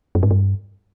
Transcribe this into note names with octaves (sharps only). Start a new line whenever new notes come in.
F#2
G#2
G2